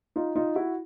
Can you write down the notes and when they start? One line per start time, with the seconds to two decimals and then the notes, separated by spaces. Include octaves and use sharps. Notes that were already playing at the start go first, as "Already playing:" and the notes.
0.16 D#4 F4
0.35 D#4 F4
0.55 E4 F#4